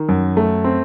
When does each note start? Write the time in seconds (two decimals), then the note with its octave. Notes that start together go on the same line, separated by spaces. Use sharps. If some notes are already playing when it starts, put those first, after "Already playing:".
Already playing: D#3
0.09 F#2
0.37 A3
0.64 C4